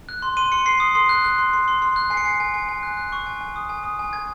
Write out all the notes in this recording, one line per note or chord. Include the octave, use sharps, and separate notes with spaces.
F#6
C6
C6 D#7
C6 C#7
C6 C7
D#6 C7
C6 C7
F#6
F#6
C6
C6
C6
C6
F#6
G#5 C7
C#7
G#5 C7
G#5
G#5
G#5
F#6
F#6
C#6
G#5
G#5
D#6
G#5
D#6
G#5
G#5 G#6